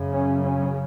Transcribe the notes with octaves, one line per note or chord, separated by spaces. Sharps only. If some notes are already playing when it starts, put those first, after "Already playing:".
Already playing: F#2 C#3
C#4
C#4